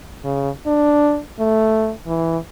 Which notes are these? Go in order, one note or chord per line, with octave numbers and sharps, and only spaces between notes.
C#3
D4
A3
E3